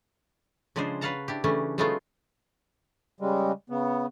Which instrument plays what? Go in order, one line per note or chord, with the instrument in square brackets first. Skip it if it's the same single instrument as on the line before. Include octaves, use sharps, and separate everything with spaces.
[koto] C#3 F3 G#3 D4 G#4 C5
B4 C#5 F5 F#5 A5 A#5
D4 E4 G4
C#3 E3 A3 C#4 D4
F#3 G#3 A3 B3 D#4 F4
[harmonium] C#3 G3 G#3
C#3 B3